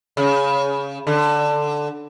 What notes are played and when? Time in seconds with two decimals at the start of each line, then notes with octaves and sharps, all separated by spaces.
0.17 C#3
1.07 D3